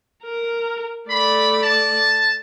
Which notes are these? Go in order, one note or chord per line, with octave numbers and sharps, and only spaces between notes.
A#4
A3 D5 B5
A5